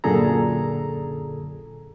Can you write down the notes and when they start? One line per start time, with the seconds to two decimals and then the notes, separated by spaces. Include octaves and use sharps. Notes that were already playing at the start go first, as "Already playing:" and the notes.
0.04 F#2 A#2 D3 G#4 A4 A#5